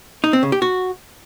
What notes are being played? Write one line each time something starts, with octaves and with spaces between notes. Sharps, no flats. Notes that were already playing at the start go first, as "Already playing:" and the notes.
D#4
C4
C#3
G4
F#4